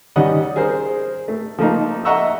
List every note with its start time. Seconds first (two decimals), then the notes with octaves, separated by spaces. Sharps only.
0.16 D#3 G3 C#4 D#5 F#5 D#6
0.56 G#4 A#4 C5
1.28 A3
1.58 F3 A3 A#3 D#4
2.05 D#5 E5 F#5 A#5 C#6 E6